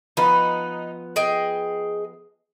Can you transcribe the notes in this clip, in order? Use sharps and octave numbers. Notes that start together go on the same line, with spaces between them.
F3 B3 D#4 B4
G#4 D#5 G5